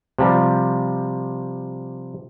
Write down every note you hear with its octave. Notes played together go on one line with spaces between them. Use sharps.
C3 F3 G3